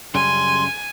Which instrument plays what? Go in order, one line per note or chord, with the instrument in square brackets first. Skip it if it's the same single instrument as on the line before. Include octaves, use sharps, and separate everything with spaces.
[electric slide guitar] F#2 C#3 G3 [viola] G#5 [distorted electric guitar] C6